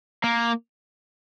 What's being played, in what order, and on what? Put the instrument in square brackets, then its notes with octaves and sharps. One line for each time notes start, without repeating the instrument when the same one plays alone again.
[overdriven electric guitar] A#3